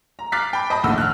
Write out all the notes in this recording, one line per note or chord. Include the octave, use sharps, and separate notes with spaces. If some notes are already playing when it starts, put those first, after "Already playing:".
A#5
D6 F6 F#6 A6 B6 C7
G5 B5
D#5 A5 B5
A#1 D#2 A2 F#5 E6
F6 F#6